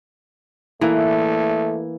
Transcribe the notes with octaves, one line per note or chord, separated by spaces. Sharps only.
E3 A3 A#3